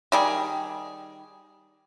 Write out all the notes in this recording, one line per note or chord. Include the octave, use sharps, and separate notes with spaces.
D#3 G3 G#4